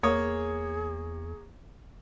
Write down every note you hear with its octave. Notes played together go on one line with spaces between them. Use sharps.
E2 A#3 G#4 C#5 D#6